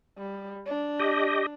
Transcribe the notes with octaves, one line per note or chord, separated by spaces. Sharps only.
G3
D4
G4 D#5